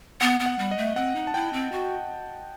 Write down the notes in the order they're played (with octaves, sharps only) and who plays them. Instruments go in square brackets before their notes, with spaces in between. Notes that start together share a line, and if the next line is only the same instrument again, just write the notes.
[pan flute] B3 [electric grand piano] F#5
[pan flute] B3
[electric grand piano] F#5
[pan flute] G3
[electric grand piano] D#5
[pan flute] A3
[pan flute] C4 [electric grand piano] F#5
[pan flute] D#4
[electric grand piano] A5
[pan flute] E4 [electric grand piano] G5
[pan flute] C4
F#4